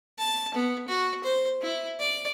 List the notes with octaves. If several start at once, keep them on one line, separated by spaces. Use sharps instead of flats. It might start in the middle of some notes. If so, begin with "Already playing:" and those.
A5
B3
F#4
C5
E4
D5